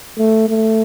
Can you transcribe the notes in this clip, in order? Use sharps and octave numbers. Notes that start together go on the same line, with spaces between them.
A3
A3